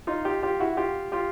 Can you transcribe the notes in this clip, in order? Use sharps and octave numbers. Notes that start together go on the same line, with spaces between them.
D#4 F4
F4 G4
F4 G4
E4 F#4
F4 G4
F4 G4